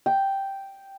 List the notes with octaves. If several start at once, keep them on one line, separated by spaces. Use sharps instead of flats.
G5